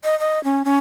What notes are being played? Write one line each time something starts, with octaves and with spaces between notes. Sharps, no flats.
D#5
D#5
C#4
C#4